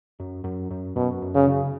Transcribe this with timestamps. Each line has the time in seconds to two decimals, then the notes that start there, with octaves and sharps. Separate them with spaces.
0.20 F#2
0.44 F#2
0.71 F#2
0.96 F#2 B2
1.22 F#2
1.35 C#3
1.47 C#3